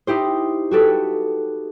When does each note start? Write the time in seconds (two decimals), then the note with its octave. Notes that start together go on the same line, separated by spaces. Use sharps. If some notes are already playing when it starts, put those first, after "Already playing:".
0.07 D#4 E4 G4 C5
0.71 F#4 G4 A4 B4